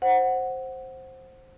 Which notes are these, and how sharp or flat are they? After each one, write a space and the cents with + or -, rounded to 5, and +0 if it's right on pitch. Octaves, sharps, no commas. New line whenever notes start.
C5 +10 F#5 +0